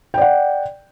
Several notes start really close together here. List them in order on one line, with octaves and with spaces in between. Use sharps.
G5 D5 F#5